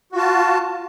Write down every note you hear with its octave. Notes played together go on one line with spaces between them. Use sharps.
F4 F#4 A5